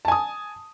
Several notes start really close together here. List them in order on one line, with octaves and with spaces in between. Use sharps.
A5 G#5 D#6